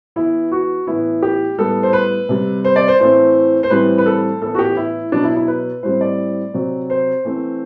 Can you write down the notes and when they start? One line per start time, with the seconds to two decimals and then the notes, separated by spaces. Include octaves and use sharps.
0.16 E3 B3 E4
0.52 F#4
0.87 A2 E3 B3 E4
1.22 G4
1.58 A2 G3 B3 A4
1.83 C5
1.93 B4
2.29 C3 G3 C4
2.64 C5
2.76 D5
2.88 C5
3.00 A2 E3 A3 C4 C5
3.63 C5
3.70 A2 E3 G3 C4 B4
3.98 B4
4.06 A4
4.42 A2 E3 B3 A4
4.55 F#4
4.59 G4
4.77 E4
5.12 B2 F#3 B3 D4
5.24 E4
5.36 E4
5.48 B4
5.83 A2 G3 C4 C5
6.01 D5
6.54 C3 F#3 C4
6.90 C5
7.25 E3 A3 C4